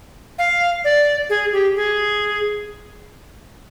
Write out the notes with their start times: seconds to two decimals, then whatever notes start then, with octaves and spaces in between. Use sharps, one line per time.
0.39 F5
0.84 D5
1.30 G#4
1.53 G4
1.76 G#4